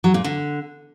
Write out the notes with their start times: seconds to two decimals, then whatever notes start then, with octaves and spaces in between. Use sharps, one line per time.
0.04 F#3
0.14 A#2
0.24 D3